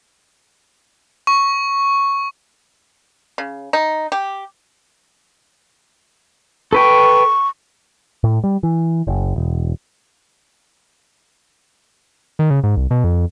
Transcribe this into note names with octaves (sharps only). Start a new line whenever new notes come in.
C#6
C#3
D#4
G4
A4 B4 G5 C#6
A2
G3
E3
F#1
E1
D#3
C#3
G#2
C2
B2
F2